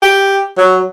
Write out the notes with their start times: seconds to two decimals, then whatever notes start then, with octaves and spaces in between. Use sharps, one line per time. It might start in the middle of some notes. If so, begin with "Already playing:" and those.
0.03 G4
0.58 F#3